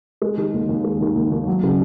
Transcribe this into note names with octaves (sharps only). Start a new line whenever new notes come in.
G#3
D#3
D#2
D#2
G#3
D#3
D#2
D#2
F#3
C#3